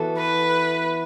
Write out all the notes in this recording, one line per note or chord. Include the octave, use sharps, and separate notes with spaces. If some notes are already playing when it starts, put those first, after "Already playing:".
Already playing: E3 B3 F#4 A4
B4